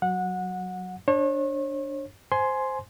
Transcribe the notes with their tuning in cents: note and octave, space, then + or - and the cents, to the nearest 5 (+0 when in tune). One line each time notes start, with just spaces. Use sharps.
F#3 +0 F#5 -20
D4 +0 C#5 -40
C5 +0 G#5 +15 C6 +0